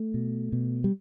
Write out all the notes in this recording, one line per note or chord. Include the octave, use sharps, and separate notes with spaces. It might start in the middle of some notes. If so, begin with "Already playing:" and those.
Already playing: A3
B2
B2
G3